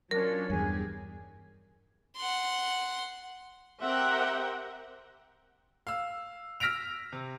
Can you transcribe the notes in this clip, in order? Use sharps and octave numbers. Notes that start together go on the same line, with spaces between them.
F#3 C#4 D4 F4 A#4 C#5
E2 G2 G4 G#4 G#5
F#5 C6
C4 G4 A#4 E5 F#5 G5
F5 E6
E6 F6 A#6 B6 D7 F7
C3